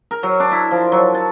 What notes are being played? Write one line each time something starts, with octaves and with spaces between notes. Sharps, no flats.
A#4
F#3
D4
E4
F3
F#3
A5